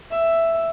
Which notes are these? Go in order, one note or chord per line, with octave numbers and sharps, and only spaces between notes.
E5